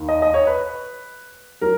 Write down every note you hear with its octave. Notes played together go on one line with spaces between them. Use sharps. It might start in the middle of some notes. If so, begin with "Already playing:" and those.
Already playing: D#2 D#3
D#5
D#5
C#5
B4
F#3 A#4